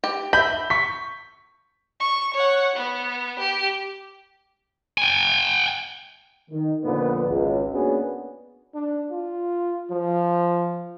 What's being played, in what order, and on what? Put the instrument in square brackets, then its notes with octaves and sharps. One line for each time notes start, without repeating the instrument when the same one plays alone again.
[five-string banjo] G4
[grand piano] E5 G6 [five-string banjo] B5
[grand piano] C#6 B6
[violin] C#6
C#5 F#5
B3
G4
[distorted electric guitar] G5 G#5
[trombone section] D#3
F2 A#2 D3 B3 B4
G#1 C#2
A#3 B3 C#4 D4 F#4 G#4
[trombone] D4
F4
F3